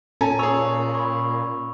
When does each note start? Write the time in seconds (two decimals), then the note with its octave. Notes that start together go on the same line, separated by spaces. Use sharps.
0.21 A#2 C#4 A4 G#5 A#5
0.39 G#4 C#5 C#6 E6 F7
0.95 B5 C#6